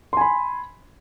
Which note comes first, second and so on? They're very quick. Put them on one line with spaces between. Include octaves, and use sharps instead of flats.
C6 G#5 B5